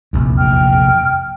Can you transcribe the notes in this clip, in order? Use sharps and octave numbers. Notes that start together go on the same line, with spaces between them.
F1 A#1 E2
G5 F6